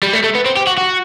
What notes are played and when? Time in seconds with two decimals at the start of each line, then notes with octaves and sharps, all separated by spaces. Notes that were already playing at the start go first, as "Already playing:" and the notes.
0.03 G3
0.13 A3
0.24 A3
0.35 B3
0.46 C4
0.56 G4
0.67 F#4
0.77 F#4